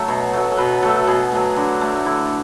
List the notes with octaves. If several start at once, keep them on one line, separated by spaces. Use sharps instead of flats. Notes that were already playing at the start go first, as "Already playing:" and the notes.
Already playing: F#3 A3 E5
B2 C#5
F#3 A3
A4
B2 B4
F#3 A3 A4
B2 G#4
F#3 A3
D3 F#4
A3
D3 E4